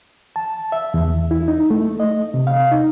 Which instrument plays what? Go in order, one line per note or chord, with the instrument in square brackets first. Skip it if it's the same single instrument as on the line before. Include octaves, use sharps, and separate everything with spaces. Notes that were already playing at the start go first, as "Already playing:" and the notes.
[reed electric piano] A5
E5
E2
E4
D#4
A3
D#5
C3
F5
D#4